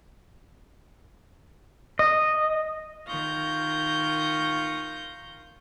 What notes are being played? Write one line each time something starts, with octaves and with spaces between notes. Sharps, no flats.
D#5
D#3 F4 C#6 F6 G6 A#6